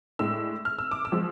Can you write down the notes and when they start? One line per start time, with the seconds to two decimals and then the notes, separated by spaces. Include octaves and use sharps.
0.19 A2 G#3 D4 E6
0.65 F6
0.79 E6
0.91 D6
1.05 E6
1.12 F3 G#3